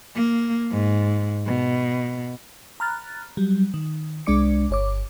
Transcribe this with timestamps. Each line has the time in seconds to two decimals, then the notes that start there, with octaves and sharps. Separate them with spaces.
0.15 A#3
0.72 G#2
1.47 B2
2.80 A#5 B5 F6 F#6 A6
3.37 F#3 G3
3.74 D#3
4.26 C2 G#3 D4 D5 D6 C#7
4.70 G1 C#5 D6